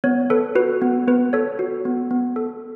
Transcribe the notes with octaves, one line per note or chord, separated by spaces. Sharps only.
B3 C#5
A4 B4
F#4 B4
B3
B3 B4
A4 C#5
F#4
B3
B3
A4